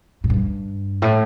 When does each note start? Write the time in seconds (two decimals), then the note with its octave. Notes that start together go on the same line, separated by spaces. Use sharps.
0.24 A2
0.30 G2
1.02 A2